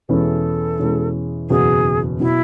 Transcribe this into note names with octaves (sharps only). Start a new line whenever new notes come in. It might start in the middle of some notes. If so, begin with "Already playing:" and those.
E2 B2 G#3 C#4 E4 A4
E2 B2 G#3 C#4 E4
F#1 E2 B2 F#3 G#4
B2 F#3 E4